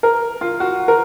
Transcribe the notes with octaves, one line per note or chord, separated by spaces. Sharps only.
A#4
F4
F#4
A#4